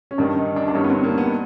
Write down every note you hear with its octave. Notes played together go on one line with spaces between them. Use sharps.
C#4
G2 D#3 D4
D#4
D4
D4
G2 D#3 C#4
B3
C4
A#3
B3